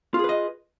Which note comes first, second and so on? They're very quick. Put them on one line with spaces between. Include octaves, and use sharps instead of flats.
F4 G#4 B4 D#5